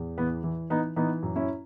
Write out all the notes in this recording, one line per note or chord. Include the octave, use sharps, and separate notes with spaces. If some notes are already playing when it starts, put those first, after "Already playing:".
Already playing: E2
E3 B3
E3
E3 B3 D#4
E3 B3 D#4
F#2
C#4 E4